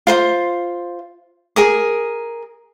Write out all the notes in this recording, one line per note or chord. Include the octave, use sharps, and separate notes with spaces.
F4 C5 C6
G#4 A#4 D#6